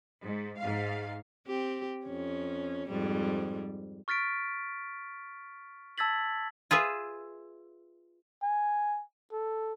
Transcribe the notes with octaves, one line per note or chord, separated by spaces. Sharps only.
G#2
G#2 F5
C4 G4
F2 C#4
F2 G#2 G3
C#6 F6 A6 B6 D7
A5 E6 G#6 A6 B6 F#7
F4 G#4 B4 E5
G#5
A4